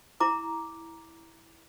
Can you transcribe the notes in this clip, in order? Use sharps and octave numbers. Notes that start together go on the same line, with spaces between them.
E4 A#5 D6